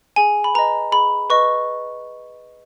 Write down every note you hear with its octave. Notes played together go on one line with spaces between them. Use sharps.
G#4 G#5
B5
B4 D#5 A#5
G#4 B5
B4 D#5 C#6